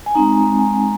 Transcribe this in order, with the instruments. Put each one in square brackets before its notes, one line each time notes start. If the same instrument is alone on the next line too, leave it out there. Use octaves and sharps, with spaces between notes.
[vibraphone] G#5
G#3 C4 D#4 A#5
G#5